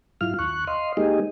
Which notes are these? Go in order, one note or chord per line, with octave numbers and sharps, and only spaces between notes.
G#2 F#3 E4 F4 F5 F6
D#2 C#6 F#6
D#5 F5 C6
G#3 A#3 D#4 G4 G#4 D#5